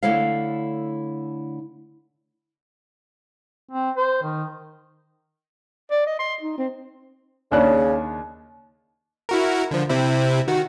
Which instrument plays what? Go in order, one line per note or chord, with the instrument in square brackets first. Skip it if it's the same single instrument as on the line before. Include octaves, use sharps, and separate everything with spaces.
[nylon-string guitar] D3 A3 E4 A4 C#5 F5
[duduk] C4
C5
D#3
[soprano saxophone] D5
D#5
C6
D#4
C4
[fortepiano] D#2 D4 F#6 [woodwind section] C#3
[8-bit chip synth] E4 F#4 A#4
D3 F3
C3 C4 E4
D#3 F#4